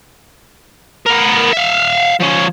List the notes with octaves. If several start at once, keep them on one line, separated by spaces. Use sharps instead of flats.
B3 A#4
E5 F5
F3 C#4